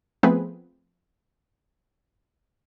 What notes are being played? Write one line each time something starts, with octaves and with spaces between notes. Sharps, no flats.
F3 A3 B3 C4 G#4 B4